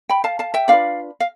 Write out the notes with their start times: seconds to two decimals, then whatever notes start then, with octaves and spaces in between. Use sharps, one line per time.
0.09 G5 B5
0.24 F5 A5
0.39 F5 A5
0.54 E5 G5
0.68 D4 F4 B4 D5 F5
1.20 F5